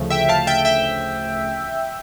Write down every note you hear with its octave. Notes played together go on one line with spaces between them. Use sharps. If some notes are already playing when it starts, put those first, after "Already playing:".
Already playing: D2 C#3 F3 A3
E5 G5
F5 A5
E5 G5
E5 G5